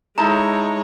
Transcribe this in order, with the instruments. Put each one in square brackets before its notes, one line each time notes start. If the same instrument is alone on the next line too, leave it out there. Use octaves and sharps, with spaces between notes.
[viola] G#3 C#5 [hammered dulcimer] D#4 E4 A4 [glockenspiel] A#5